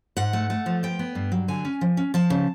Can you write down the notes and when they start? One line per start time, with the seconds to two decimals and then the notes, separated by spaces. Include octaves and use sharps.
0.17 G#2 F#5
0.33 A3
0.50 A3
0.66 F3
0.83 B3 G5
0.99 B3
1.15 G2
1.32 F#3
1.48 D3 G#5
1.65 C#4
1.81 F3
1.97 C#4
2.14 F3 A5
2.30 C#3